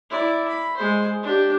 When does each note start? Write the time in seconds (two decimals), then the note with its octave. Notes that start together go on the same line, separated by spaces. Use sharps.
0.10 E4 D5
0.48 B5
0.77 G#3 C5
1.23 D4 G4